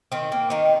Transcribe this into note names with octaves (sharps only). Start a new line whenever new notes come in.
D#3 C4
A#3
D#3 D#4